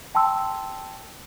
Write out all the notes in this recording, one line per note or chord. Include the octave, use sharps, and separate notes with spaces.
G5 A5 C6 E6